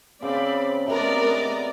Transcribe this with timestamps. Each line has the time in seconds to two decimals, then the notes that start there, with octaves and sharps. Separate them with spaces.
0.22 C#3 C4 D5 B5
0.88 C3 A3 B3 C#4 D4 A#4 D5 D#5